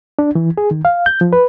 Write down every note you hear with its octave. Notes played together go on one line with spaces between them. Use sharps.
D4
E3
G#4
D#3
F5
G6
F3
B4